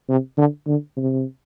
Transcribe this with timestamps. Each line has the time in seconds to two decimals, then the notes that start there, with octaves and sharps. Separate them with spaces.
0.09 C3
0.37 D3
0.67 D3
0.97 C3